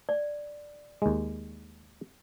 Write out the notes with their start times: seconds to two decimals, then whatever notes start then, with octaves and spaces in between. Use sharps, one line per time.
0.09 D5
1.02 D#2 G#3